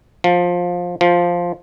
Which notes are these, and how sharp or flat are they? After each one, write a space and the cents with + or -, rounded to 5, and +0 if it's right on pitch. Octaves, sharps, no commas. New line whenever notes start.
F3 +15
F3 +0